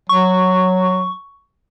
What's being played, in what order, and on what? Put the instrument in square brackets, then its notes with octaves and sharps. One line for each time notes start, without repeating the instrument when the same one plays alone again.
[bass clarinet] F#3 [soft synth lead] C#6